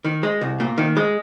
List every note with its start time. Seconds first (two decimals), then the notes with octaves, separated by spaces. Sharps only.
0.04 D#3
0.23 G#3
0.41 C2
0.60 A#2
0.78 D#3
0.97 G#3